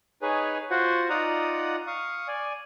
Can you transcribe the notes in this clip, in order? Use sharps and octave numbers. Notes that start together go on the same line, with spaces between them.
D#4 G#4 B4 C#5 G#5
F4 F#4 C5 F#5
D#4 F4 D5 F#5 A#5 D#6
F5 C#6 D#6
D5 G#5